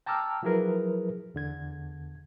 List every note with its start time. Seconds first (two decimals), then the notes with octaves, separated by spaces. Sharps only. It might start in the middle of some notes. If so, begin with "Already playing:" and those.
0.06 G5 A5 A#5 D6 E6 F6
0.43 F3 F#3 E4 G#4 A#4 B4
1.34 E2 D3 G#6